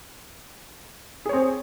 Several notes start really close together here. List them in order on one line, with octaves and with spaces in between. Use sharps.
G#4 C#5 C4